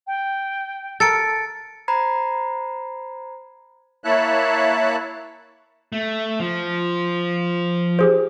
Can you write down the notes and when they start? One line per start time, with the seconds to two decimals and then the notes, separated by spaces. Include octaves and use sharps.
0.07 G5
1.00 A4 A#4 A6 C#7 D7
1.88 C5 A#5 B5 G#6 C7
4.04 A#3 E4 C#5 E5 A5 F#6
5.92 A3
6.40 F3
7.99 G4 G#4 C5